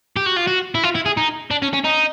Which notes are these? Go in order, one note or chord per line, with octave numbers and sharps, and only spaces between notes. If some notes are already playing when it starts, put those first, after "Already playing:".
G4
F#4
F4
F#4
E4
F4
E4
G#4
D#4
D4
C#4
C#4
D#4